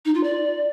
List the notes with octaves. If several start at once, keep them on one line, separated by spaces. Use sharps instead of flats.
D#4
F4
D5